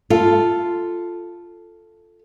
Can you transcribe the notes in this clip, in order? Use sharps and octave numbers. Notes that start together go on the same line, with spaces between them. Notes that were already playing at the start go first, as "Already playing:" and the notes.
F4 A4